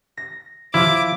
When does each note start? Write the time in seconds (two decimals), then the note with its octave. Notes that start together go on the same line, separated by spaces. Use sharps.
0.17 A#6
0.74 F3 E4 D6